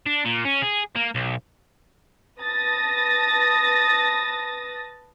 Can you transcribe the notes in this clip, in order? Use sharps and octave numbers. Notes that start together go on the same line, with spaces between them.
D4
A#2
C#4
G#4
A#3
B1
B4 A5 D#6 A6 A#6